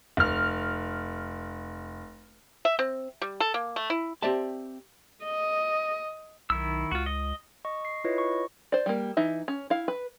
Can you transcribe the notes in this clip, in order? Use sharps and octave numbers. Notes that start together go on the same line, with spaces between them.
F1 F6
E5
C4
G3
A4
A#3
A3
E4
C4 G4 C5 D5 E5 A5
D#5
B1 D#3 E4 E6
C#2 F4 F#4
D#5
D#5 C#6
C7
E4 F4 B4 C#5 D#5
C#6
C5 D5
G3 A#3
E3 D#4 E5
C#4
E4 F5
B4